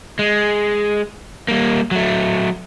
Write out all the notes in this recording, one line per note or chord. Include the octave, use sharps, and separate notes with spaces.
G#3
G3 A#3
F#3 A3